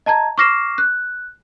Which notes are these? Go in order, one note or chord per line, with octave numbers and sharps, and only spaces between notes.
D#5 A5 A#5 G#6
C#6 D6 F6 A#6 C7 E7
F#6